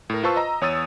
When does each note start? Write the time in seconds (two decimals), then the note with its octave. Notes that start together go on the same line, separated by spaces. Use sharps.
0.10 A2 A#4
0.23 F4 B4 C5 A5 C#6 E6
0.36 D#5 A#5
0.61 E2 C#5 D#6 E6 A6 D#7